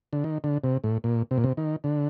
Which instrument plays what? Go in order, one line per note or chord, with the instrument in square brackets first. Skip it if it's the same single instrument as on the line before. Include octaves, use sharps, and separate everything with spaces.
[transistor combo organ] D3
D#3
D3
C3
A2
A#2
C3
A#2
C3
D#3
D3